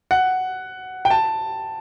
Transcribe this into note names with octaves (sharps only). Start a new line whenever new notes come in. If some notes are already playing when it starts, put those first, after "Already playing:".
F#5
G5
A5